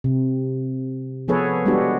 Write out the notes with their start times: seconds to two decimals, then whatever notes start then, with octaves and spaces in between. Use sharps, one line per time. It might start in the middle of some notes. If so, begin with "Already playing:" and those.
0.04 C3
1.28 F3 B3 G#4 A4 B4 C#5
1.66 G3 G#3 B3 D4 F#4 G4